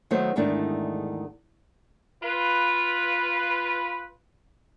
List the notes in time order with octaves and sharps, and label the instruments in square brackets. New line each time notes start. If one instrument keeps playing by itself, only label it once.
[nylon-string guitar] D#3 F#3 A3 B3 C5
E2 G#2 D#3 A3 D4 E4
[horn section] F4 B4